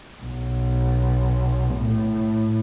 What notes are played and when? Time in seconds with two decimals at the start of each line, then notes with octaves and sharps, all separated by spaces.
0.23 B1
1.76 A2